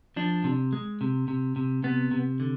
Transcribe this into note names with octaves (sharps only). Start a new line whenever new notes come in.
F3 D4
C3
G#3
C3
C3
C3
C3 B3
C3
D3